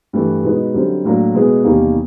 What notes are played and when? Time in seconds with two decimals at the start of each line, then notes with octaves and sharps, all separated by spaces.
0.13 G2 E3 A3
0.44 B2 G#3 B3 D#4
0.74 F#2 D3 G3 C4
1.05 A2 F#3 A#3 D4
1.35 B2 G#3 B3 E4 G#4
1.64 E2 C3 D#3 G3 A#3